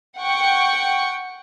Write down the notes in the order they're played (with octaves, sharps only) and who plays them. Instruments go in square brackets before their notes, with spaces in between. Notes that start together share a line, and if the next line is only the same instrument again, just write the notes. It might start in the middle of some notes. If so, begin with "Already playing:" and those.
[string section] F#5 G5 C#6